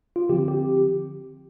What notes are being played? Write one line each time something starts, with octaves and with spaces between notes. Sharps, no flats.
F4
D3 F3 C4 G4
G4